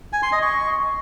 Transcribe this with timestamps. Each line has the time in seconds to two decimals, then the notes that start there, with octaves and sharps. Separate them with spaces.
0.13 G#5
0.23 C6
0.32 D#5
0.42 C#6